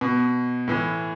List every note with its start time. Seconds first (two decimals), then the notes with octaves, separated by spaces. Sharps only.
0.01 B2
0.68 A2 E3